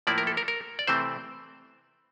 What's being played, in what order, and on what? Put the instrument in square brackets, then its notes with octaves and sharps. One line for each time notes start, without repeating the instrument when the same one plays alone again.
[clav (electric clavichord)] A2 F3 A#3 E4 D5
A#4
A4
A#4
A#4
D5
C3 E3 A3 C4 C5